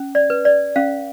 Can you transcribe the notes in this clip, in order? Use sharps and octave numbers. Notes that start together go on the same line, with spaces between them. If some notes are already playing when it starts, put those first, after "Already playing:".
Already playing: C#4
D5
B4
D5
C#4 F5